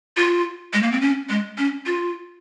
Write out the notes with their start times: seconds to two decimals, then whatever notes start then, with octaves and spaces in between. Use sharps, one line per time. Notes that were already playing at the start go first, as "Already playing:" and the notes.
0.17 F4
0.74 G#3
0.82 A#3
0.92 C4
1.01 C#4
1.29 G#3
1.58 C#4
1.86 F4